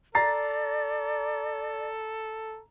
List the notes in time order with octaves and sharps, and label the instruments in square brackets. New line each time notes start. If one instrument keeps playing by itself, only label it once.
[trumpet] A4 [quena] D5 [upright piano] A#5 A6 C7